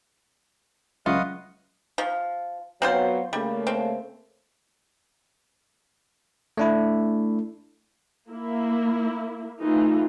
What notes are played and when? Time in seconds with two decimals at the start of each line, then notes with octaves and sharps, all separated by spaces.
1.06 C#2 F#3 F4 B4 D#5 F#5 C#6
1.98 F3
2.82 F#3 B3 C4 F4 C5
3.33 C#3 G3 A3 A#3
3.67 C4
6.57 A3 D4 E4
8.29 A#3 E4
9.60 E3 A3 D#4 F4